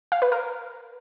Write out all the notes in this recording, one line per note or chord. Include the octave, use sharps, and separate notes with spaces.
F5
B4
A#4